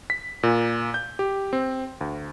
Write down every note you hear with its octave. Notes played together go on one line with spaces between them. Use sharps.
B6
A#2
G6
G4
C4
D2